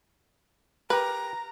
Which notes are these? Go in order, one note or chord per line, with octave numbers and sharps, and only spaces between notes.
G4 A#4 B4 A#5